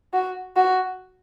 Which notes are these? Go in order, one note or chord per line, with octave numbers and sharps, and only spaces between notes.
F#4
F#4